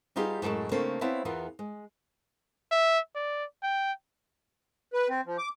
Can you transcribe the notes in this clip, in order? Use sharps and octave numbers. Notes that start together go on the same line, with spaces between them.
G3 B3 D#4 F4 G4 G#4
F#2 A2 G#3 A5
C#3 A3 A#3 C4 D4 A4
B3 C4 E4 C#5 F5 A5
E2 E3 B3 F4 A#4
G#3
E5
D5
G5
B4
C4
F3
D6